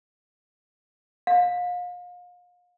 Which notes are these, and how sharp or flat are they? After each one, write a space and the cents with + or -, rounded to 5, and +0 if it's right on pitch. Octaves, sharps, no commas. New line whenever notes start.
F5 +35